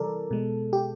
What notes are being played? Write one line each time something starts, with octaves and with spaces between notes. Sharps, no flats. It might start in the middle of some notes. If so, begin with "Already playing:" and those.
Already playing: C3 E3 G3 A4 A#4 D5
B2 G#3
G4